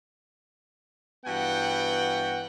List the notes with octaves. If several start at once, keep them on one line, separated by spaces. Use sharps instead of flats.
G2 E3 B3 F#4 F#5 G5